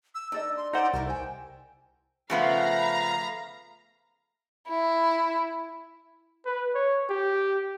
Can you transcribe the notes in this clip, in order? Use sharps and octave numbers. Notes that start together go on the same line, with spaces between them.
E6
D4 D#4 A4 D#5 E6
C6
C#4 D#4 A4 C5 D5 F#5
C2 E4 A#4 A5
C5 G5 G#5
C#3 F3 A3 B3 F5 A#5 B5
E4
B4
C#5
G4